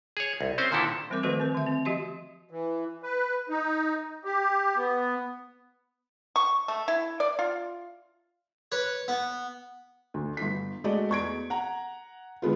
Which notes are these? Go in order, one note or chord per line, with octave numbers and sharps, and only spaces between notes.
G#4 C#5
C2
C4 C#4 C5
A#2 D3 D#3 E4 A4
E3 G3 C4 A#4 D6
D#3 F3 A3 F#4 A4 B4
C4 A#4
D3 E5
C4
F3 F#4 G4 D#5 E5 C6
E3
B4
D#4
G4
B3
C#6
A3
E4
D5
F4
B4 C#5
B3
D2
G1 B6
G#3 A3 F#4 A4 D5 D#5
E2 C#6 G#6 D7
F#5 A#5
D3 G#3 B3 F4